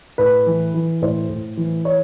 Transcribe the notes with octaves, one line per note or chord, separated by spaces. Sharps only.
A2 B4
E3
E3
A2 C5
A2
E3
C#5